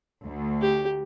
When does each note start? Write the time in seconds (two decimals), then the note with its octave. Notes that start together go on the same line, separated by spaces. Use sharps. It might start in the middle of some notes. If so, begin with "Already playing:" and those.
0.24 D2
0.61 G4